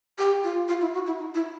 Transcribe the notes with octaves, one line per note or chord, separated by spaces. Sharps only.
G4
F4
F4
E4
F#4
E4
D#4
E4